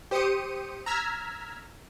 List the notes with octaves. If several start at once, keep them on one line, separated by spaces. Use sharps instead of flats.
G4 C5 D#6 C#7 D#7
A#5 E6 F6 G#6 B6